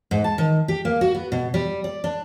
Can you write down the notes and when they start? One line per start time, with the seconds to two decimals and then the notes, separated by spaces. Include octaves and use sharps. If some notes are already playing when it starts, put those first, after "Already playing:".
0.11 G#2
0.24 A5
0.38 D#3
0.68 G4
0.85 A#3
1.01 F#4
1.15 B3
1.32 B2
1.54 G3
1.84 D5
2.04 D4